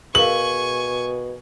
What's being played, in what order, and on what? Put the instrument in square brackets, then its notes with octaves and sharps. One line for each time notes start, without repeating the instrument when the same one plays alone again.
[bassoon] B2 [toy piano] G#4 A#4 F5 [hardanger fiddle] G#5 C#6 [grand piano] F#7